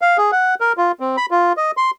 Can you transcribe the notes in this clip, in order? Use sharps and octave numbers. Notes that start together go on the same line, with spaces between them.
F5
G#4
F#5
A#4
F4
C4
B5
F4
D#5
C6